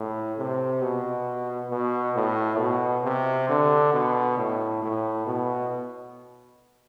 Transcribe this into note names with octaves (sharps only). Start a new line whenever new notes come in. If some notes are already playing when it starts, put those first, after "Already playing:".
Already playing: A2
C3
B2
B2
A2
B2
C3
D3
B2
A2
A2
B2